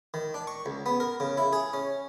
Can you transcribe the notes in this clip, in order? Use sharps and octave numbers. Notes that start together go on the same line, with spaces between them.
D#3
D4
C#6
C#2
B3
A#4
C#3
E4
G#4
C#4